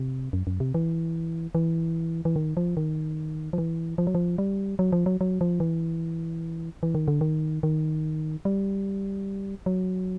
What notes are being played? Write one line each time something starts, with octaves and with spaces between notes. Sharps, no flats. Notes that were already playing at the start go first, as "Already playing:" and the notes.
Already playing: C3
F#2
F#2
C3
E3
E3
E3
D#3
F3
D#3
F3
E3
F3
F#3
F3
G3
F#3
F3
F#3
F#3
F3
E3
E3
D#3
D3
D#3
D#3
G3
F#3